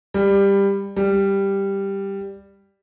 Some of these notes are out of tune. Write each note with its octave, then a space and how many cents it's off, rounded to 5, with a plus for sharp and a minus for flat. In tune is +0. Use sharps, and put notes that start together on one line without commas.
G3 +15
G3 +5